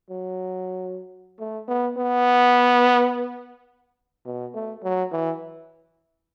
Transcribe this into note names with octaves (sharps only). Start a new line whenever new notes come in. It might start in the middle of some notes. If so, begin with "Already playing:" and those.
F#3
A3
B3
B3
B2
A3
F#3
E3